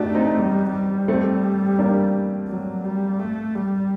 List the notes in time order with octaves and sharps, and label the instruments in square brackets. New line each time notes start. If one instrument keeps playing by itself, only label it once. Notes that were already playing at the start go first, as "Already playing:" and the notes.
Already playing: [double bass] A3 [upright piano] D4 D#4 F#4 G4
[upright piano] C4 D#4
[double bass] G3
G3
[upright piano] A3 C4
A#3 D4
[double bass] F#3
G3
A3
G3